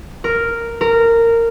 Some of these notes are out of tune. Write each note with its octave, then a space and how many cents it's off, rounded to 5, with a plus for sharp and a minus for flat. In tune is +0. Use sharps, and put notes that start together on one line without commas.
A#4 -5
A#4 -15